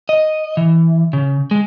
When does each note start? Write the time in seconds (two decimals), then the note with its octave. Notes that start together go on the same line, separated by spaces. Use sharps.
0.09 D#5
0.57 E3
1.13 C#3
1.51 G#3